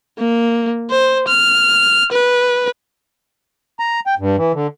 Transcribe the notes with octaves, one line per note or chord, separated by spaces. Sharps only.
A#3
C5
F6
B4
A#5
G5
G2
E3
D3